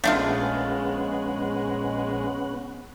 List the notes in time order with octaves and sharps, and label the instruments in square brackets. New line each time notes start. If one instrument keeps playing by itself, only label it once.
[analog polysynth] A#1 G#3 [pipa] A3 D4 F4 [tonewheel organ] B3 C#4 F#5